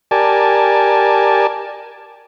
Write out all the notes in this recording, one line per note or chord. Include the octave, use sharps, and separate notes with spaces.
G4 A#4 D5 G#5 A5